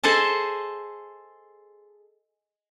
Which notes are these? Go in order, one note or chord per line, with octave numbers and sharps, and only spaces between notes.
G#4 A4 C5 D#5 A5